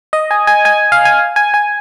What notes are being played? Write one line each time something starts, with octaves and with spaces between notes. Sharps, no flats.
D#5
G#5
G#5
G#5
F5
G#5
G#5
G#5